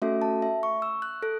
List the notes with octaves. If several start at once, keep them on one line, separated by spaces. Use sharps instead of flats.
A3 C#4 F#4 A4 E5
A5
E5
C#6
E6
F#6
A4 F#6